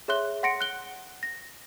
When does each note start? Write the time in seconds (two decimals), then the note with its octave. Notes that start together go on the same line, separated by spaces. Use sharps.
0.08 G#4 C#5 E5 C6 F#6 G7
0.43 F#5 C6 A#6 C#7 D7
0.61 F#6 G7
1.23 A#6